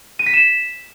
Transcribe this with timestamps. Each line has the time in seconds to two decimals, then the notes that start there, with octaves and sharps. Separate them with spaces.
0.19 D#7
0.26 B6
0.33 E7